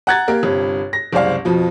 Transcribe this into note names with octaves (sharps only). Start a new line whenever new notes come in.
F#5 A#5 F#6 G#6 A6
A#3 G4 A#4
G1 G2 C3
A#6
F#1 C2 G#3 C5 D5 F5
F2 B2 F3